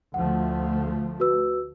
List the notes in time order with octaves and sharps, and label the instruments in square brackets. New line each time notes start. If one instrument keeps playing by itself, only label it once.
[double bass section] D2 F3 A3 [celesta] F#5
[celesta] F#4 B4 E6